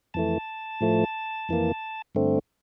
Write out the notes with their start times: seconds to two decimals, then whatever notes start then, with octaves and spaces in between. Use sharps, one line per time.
0.14 F2 E3 A3 A5
0.81 A2 F3 A3
1.49 F2 E3 A#3
2.15 G2 D3 A3 C4